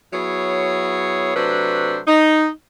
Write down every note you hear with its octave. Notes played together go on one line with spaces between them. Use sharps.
F#3 B3 E4 G#4 C#5
C3 F#3 A3 D4 B4 C5
D#4